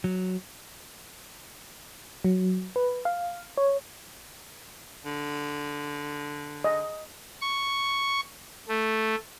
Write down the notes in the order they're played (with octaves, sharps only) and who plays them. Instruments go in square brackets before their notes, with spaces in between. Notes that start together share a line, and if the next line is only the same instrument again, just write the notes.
[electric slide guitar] F#3
[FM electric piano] F#3
B4
F5
C#5
[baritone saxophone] D3
[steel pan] D#5
[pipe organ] C#6
A3